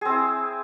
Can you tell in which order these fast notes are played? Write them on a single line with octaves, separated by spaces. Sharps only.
G#4 C4 E4